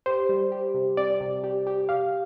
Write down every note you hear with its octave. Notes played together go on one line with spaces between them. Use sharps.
G4 C5
G3
G4
C3
C4 D5
C3
G4
G4
G4 F5